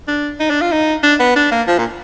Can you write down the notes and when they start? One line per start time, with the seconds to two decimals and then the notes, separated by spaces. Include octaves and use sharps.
0.08 D4
0.40 D#4
0.51 D4
0.61 F4
0.72 D#4
1.04 D4
1.20 B3
1.36 D4
1.52 A#3
1.68 F3
1.78 A#2